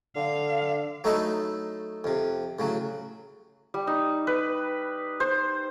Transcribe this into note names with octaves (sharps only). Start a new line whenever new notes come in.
D3 F5
F#3 A3 D#4 E4 A4 D#5
F2 C3
A2 C#3 F#3
G3
D#4
B4
C5